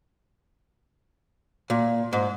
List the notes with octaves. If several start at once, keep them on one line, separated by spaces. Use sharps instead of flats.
A#2
G#2